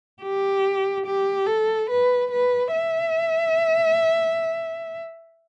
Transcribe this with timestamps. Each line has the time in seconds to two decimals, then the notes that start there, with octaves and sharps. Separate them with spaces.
0.23 G4
1.06 G4
1.47 A4
1.90 B4
2.31 B4
2.73 E5